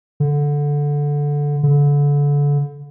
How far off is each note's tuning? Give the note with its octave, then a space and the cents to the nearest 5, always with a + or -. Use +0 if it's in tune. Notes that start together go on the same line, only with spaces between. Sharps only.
D3 -10
D3 -30